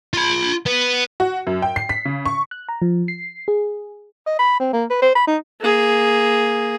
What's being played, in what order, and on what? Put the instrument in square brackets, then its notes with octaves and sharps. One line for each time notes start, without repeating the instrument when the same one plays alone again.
[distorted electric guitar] F4 B5
B3
[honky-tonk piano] F#4
F#2
G5
C7
B6
C#3
C#6
[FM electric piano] F#6
A#5
F3
C7
G#4
[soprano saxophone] D#5
B5
C4
A#3
B4
C5
B5
D#4
[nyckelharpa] A#3 G#4